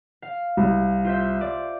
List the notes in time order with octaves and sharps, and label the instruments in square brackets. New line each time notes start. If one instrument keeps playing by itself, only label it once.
[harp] F5
[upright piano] C2
[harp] F4 C5 E5
D5